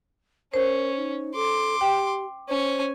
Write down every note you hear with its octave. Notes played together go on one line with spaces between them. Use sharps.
C#4 A#4 C5
D#4
A4 C6 D6
G4 G5
C#4 C5 G#5